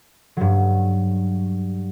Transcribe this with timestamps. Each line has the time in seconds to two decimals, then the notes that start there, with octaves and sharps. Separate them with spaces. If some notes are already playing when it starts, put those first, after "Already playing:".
0.37 G2 F#3